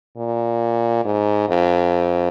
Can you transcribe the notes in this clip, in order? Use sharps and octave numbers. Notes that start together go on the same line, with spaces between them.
A#2
G#2
F2